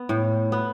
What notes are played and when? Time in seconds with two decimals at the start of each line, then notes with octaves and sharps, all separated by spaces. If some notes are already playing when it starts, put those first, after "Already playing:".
Already playing: B3
0.09 A2
0.52 B3